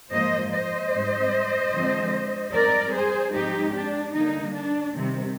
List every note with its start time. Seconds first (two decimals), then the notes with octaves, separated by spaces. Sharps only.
0.12 G#2 F3 A#3 C5 D#5
0.52 C5 D#5
0.93 G#2 G3 C4
1.73 D3 F3 G#3 C4
2.53 G#2 G3 C4 A#4 D5
2.93 G#4 C5
3.34 G#2 F3 G#3 C4 D#4 G4
3.74 D4
4.14 D3 G3 A#3 D#4
4.54 D4
4.94 C3 D#3 G3 C4